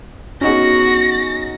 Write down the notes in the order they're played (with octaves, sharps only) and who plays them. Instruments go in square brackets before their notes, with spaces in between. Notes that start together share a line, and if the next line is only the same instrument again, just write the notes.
[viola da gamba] B3 F#4 [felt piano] C#4 D#4 G#4 [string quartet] A#6